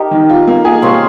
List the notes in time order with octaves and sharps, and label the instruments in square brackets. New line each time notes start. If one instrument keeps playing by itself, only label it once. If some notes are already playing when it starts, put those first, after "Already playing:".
Already playing: [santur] D#4 G4 A#4
[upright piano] D#3
F4
A#3
G#4
[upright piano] C3 [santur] C#4 F4